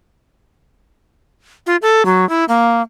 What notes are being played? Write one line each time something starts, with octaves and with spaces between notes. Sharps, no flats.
F4
A4
F#3
E4
A#3